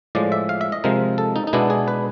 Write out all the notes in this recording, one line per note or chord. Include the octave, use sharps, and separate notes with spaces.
A2 F3 G#3 D5
E5
F5
E5
D#5
C3 F3 G#3 A#4
A4
D#4
D#4
B2 G#3 B3 D4 E4
G#4
B4